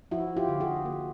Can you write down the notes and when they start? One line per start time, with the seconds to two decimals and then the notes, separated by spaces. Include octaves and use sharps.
0.11 F3 E4 F#4
0.37 F4 G4
0.49 D3
0.60 F#4 G#4
0.85 A#3